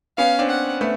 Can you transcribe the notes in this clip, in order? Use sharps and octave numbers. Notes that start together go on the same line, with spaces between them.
B3 C#4 F5
C4 D4
F#5
A3 B3